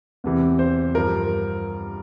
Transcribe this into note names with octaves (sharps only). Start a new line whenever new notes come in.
E2 C3 E3
C5
G2 F3 A#4